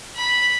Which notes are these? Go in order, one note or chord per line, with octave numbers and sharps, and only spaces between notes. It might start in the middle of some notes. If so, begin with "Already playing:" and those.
B5